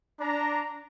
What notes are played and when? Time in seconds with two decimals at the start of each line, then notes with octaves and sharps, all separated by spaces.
0.19 D4 A#5